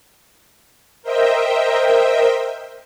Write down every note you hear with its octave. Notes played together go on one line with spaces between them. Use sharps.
A#4 C5 D#5 E5 G5